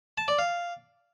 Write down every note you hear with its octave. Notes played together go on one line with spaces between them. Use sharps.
A5
D5
F5